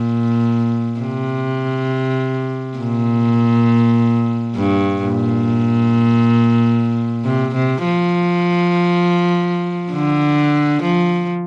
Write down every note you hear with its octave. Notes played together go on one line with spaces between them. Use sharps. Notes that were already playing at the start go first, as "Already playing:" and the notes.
Already playing: A#2
C3
A#2
G2
A#2
C3
C3
F3
D3
F3